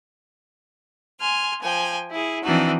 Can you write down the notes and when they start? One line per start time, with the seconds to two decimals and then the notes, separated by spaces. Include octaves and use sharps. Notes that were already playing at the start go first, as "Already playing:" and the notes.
1.20 G#5 C6 F6
1.61 F3 G5 G#5
2.10 E4 G#4
2.43 E3 F3 C4 D4 D#4 F#4